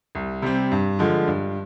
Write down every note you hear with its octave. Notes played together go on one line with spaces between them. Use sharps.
C2
C3 G3 C4
G2
D3 F3 G#3
G2